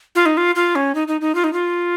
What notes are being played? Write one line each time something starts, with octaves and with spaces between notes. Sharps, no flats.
F4
D#4
F4
F4
C#4
D#4
D#4
D#4
F4
D#4
F4